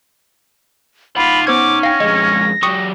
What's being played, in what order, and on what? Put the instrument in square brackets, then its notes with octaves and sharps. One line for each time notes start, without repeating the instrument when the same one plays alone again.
[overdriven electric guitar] D#4 F#5 [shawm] F4 [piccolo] B5
[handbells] B3 C5 G#6 [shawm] C#4 [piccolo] D6
[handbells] F5 G5 [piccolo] A#6
[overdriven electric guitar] F2 G#3 [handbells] D#5
[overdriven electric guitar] F#3 G4 [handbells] C#6 D#6 C#7